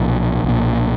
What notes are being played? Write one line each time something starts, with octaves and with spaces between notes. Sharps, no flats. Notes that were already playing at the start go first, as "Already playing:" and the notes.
Already playing: B1 A#2 F3
B1 A#2